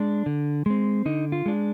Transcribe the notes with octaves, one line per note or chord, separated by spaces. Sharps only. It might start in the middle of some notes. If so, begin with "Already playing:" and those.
Already playing: G#3 D4
D3
G#3 C4
D3 D#4
F4
G#3 D4